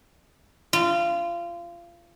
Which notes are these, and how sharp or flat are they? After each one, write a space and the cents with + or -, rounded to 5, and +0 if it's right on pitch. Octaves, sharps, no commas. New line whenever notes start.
F4 -25